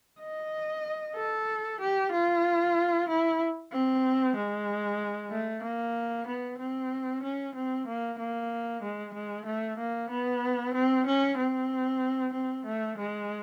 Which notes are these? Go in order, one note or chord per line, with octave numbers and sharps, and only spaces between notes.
D#5
A4
G4
F4
E4
C4
G#3
A3
A#3
B3
C4
C#4
C4
A#3
A#3
G#3
G#3
A3
A#3
B3
C4
C#4
C4
C4
A3
G#3